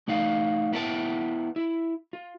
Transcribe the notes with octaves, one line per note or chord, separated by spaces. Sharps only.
A3 D#4 D5 F5
B3 E4 F4 A#4 G5 A5
E4
F4